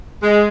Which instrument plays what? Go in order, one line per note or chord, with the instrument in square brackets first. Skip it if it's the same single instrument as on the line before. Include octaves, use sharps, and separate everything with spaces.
[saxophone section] G#3